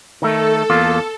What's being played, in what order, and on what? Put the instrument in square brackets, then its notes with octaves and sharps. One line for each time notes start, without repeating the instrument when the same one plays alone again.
[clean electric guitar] D#3 A3 [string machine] A4
[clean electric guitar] E2 A#3 F4